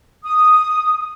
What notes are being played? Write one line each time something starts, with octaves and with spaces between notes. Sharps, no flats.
D#6